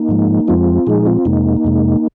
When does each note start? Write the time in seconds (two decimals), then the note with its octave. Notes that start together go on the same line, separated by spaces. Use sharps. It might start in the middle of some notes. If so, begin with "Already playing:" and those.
Already playing: A#3 D#4
0.09 G#2 F3 G#3
0.48 F2 F3 G#3 C4 F4
0.87 A#2 F3 G#3 D#4 G#4
1.06 C4 F4
1.25 F2 C3 G#3 A#3 D#4
1.64 F2 C3 G#3